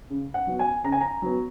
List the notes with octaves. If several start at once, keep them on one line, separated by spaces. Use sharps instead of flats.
C#3
F#5
F#3 B3
G#5
C#3 A#5
G#5
A#5
F#3 B3